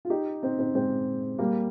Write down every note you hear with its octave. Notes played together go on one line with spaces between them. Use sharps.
F4
D#4 G4
C4 D#4
C4 D#4
G#3 C4
G3 A#3